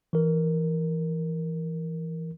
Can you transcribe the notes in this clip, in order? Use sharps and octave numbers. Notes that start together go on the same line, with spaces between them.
E3 A#4